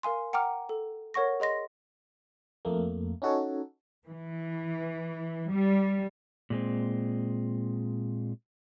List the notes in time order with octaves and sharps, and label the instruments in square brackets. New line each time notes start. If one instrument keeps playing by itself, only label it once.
[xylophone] A#4 F5 G#5 C6
F#5 G5 A#5 D6 F6
A4
A#4 C#5 F#5 C#6 A#6
G#4 D#5 C6 A#6
[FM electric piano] F2 A3 A#3
C#4 D#4 F#4 A4 C#5
[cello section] E3
G3
[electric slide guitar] A#2 G#3 C4